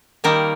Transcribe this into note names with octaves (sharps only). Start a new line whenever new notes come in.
D#3 G3 A#3 A#4